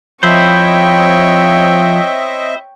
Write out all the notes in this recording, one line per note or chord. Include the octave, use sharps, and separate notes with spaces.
F3 C4 E4 C5 C#5 D#5 E5 G5